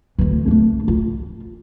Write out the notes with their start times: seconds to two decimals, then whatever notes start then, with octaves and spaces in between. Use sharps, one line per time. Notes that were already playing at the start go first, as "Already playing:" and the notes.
0.19 D2 E3
0.48 A3 D4
0.88 F4